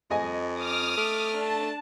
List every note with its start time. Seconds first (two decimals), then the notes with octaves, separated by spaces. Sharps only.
0.11 F2 D#5 G#5
0.60 D6 D#6 F6
0.98 A3
1.37 D4 A5